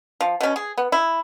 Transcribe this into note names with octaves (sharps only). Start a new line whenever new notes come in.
F3
B2 C#4
G#4
B3
E4